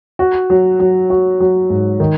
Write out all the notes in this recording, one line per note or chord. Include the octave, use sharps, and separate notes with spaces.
F#4
F#3
F#3
F#4
F#3
G#2
D#3